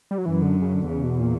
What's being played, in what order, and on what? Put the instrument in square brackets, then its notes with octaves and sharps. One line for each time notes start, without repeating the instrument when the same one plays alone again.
[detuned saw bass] G3
F#3
[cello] F#2 [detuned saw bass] E3
[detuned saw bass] D3
C#3
D3
[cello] E2 [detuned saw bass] C#3
[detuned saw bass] B2
A#2